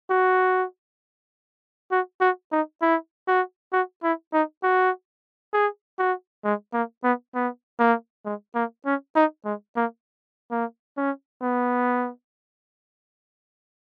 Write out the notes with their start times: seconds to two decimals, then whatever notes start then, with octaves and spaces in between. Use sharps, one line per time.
0.10 F#4
1.92 F#4
2.21 F#4
2.52 D#4
2.82 E4
3.28 F#4
3.73 F#4
4.03 E4
4.33 D#4
4.63 F#4
5.53 G#4
5.99 F#4
6.44 G#3
6.74 A#3
7.04 B3
7.35 B3
7.80 A#3
8.25 G#3
8.55 A#3
8.86 C#4
9.16 D#4
9.45 G#3
9.76 A#3
10.51 A#3
10.97 C#4
11.42 B3